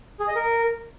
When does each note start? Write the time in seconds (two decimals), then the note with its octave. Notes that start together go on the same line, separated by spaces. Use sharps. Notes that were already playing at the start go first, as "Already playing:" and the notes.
0.20 G#4
0.28 D#5
0.36 A#4